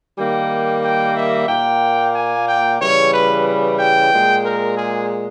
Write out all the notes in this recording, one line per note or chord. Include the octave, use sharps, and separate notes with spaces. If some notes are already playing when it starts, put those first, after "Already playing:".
D#3 G3 A#3 G5
G5
E5
A#2 A#3 G5
G#5
G5
C#3 E3 G3 C#5
B4
B4
G5
A#2 G#3
A#4
G#4